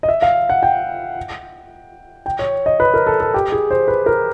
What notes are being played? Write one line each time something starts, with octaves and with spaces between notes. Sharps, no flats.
D#5
E5
F5
F#5
G5
G5
C#5
D#5
B4
A#4
A4
A4
G4
G#4
C5
B4
A#4